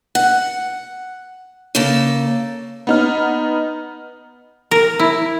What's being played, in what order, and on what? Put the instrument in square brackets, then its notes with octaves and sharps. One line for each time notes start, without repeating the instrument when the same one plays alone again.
[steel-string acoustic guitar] F#5
C#3 A#3 A4
[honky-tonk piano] B3 D#4 F6
[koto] A#4
E4